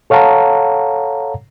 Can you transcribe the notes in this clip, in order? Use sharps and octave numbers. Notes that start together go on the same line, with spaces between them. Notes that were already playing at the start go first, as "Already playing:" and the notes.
A4 C#5 F5 F#5 A5 A#5